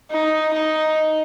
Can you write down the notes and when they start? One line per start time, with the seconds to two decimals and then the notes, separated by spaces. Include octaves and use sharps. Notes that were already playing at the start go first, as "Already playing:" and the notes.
0.11 D#4
0.53 D#4